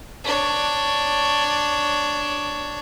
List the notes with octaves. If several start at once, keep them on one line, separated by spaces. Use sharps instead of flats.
D4 C#5